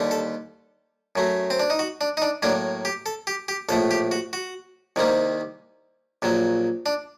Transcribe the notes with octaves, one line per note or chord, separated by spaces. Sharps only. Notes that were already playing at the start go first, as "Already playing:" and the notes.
Already playing: D#2 D3 G3
A4
F#2 F#3 A3
C4
D4
D#4
F#4
D4
D#4
D4
A2 F#3 A#3 D4
G4
A4
G4
G4
A#1 A2 A3 A4
G4
F#4
F#4
C2 C3 D#3 G3 A#3
A#1 A#2 F#3
D4